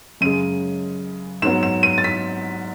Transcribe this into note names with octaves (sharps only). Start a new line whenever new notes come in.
F#2 C#3 G#3 D#7
G#2 F#3 B3 E7
E7
D#7
A6
B6